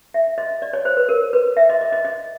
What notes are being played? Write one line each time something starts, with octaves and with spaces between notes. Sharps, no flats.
E5
D#5
D5
C#5
C5
B4
A#4
B4
E5
D#5
D#5
D#5
D#5